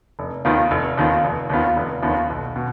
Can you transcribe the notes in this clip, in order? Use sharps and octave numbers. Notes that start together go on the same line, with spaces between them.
F1
D#2 D#3 B3 F4
F1
D#2 D#3 B3 F4
F1
D#2 D#3 B3 F4
F1
D#2 D#3 B3 F4
B1
B2